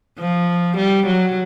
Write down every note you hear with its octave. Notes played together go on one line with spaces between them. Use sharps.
F3
G3
F#3